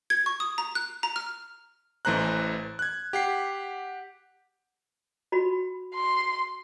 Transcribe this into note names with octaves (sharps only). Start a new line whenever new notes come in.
G#6
C#6
D#6
A#5
F#6
A#5
F6
A1 E3 A3 C5 A#5 F#6
F#6 G#6
G4 F#5 C7
F#4 B5
C6